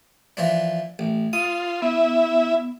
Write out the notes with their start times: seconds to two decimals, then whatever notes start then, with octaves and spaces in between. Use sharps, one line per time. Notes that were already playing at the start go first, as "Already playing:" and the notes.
0.37 E3 F3 D4
0.99 A1
1.33 F4 D#6
1.82 B3 E4 E5